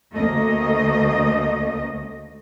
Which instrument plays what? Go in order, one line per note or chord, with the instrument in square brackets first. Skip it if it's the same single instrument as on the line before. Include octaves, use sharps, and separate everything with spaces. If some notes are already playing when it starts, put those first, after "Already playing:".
[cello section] D2 A3 A#3 D#5